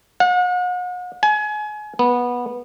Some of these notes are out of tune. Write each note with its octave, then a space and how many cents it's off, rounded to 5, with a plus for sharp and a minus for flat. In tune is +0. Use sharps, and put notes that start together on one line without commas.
F#5 -40
G#5 +30
B3 -15